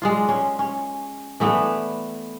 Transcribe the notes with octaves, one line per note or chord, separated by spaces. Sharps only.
G#3 D4 F4
C#4
C#4
E3 A3 B3 D4